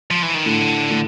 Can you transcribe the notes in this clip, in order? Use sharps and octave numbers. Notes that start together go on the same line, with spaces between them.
F3
E3
D#3
A2 D3
A2